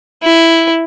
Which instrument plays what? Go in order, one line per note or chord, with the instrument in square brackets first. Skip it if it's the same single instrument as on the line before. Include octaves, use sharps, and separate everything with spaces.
[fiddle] E4